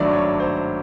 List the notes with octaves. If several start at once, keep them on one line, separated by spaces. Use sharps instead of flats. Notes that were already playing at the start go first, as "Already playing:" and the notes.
Already playing: G#1 G2 D#3 F#3 A3 D5
C#5
C#5
C5